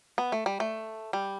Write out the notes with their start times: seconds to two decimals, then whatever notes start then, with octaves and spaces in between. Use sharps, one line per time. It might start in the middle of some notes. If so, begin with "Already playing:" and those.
0.18 B3
0.32 A3
0.46 G3
0.60 A3
1.13 G3